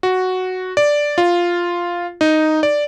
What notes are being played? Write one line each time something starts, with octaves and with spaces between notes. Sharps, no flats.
F#4
D5
F4
D#4
D5